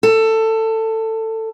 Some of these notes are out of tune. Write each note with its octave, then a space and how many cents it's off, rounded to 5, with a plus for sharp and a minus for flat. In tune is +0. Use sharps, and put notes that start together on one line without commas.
A4 +15